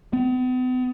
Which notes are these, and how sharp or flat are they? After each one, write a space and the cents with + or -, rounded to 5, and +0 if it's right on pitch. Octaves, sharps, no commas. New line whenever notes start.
B3 +45